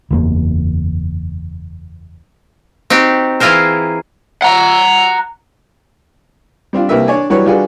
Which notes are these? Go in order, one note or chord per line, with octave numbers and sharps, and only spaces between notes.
F#1 E2 A#3
C4 D#4 F#4 G4
E3 E4 F4 G#4 A#4 C5
F#5 A#5
G3 C4 D4 F4
C2 A#3 G4 A#4 B4 E5
D4 C#5 D5 G#5
E3 F#3 G3 F#4 B4 C#5
G3 D4 F4 F#4 G#4 B4